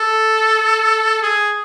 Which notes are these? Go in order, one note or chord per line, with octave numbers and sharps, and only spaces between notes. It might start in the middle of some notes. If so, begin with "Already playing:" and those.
Already playing: A4
G#4